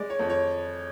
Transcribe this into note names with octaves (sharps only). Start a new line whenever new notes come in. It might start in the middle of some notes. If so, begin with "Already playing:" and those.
Already playing: G#3 D5
C#5
F2
C#5